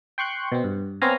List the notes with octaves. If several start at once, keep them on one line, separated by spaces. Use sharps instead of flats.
G5 C6 C#6 F#6 G6
B2 C4
G2
B3 C4 C#5 F5 G#5 A#5